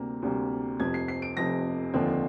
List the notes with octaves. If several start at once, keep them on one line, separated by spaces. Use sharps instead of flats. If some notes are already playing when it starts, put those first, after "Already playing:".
Already playing: D2 C3 G3 A#3
D2 C3 G3 A#3
F1 F2 C3 G#6
C7
C7
D7
F1 F2 C3 A#6
F1 D#2 D3 F3 C4